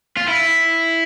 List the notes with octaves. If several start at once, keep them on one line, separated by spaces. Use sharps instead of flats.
F4
E4